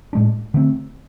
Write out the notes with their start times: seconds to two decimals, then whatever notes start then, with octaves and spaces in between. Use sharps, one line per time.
0.13 A2 G#3 D4
0.54 D3 A3 C4